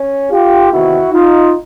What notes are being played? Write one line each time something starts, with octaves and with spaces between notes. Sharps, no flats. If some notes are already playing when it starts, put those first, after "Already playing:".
Already playing: C#4
F4 G4
E2 C3 D#3 E4 F#4
D#4 F4